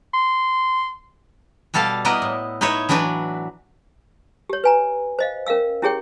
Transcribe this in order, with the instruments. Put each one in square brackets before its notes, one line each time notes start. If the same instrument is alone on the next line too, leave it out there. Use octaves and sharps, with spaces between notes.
[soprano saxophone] C6
[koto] B2 G3 A4 F5 A5
A#3 B3 E4 A#4 B4 D#5
A2
D#4 E4 B4 C#5 E5
E3 F#3 D4 F#4 B4
[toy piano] G4 C#5
B4 G#5 A#5
C5 D#5 F5
C#4 A#4 E5 F5 E6
C#4 E4 G4 G#4 C#5 G5